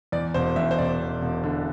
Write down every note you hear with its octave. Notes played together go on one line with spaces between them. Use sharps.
E2 D5
E1 C5
E2 E5
C5
E1 D5
E1
E1
D3